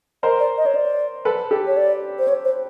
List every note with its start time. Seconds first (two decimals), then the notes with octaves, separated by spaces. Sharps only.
0.23 A#4 C5 D#5
0.40 D5
0.58 D#5
0.66 C#5
0.75 D5
1.25 A4 B4
1.51 G4 A4
1.67 C#5
1.77 D5
2.19 C5
2.28 C#5
2.45 C5